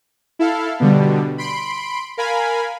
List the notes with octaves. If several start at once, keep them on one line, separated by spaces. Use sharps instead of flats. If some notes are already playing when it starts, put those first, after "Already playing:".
E4 A4 F5
B2 D3 G3
B5 C6 D7
A#4 F5 G#5 B5